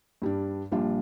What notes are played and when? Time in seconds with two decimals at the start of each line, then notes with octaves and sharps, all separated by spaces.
0.22 G2 G3 D4
0.72 A#1 A#2 G3 D4 F4